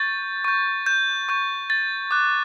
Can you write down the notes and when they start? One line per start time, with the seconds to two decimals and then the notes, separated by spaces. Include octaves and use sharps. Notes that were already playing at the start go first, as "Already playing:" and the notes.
Already playing: C#6 G6 A6
0.44 C#6 G6
0.86 G6
1.29 C#6 G6
1.70 A6
2.11 D6 F#6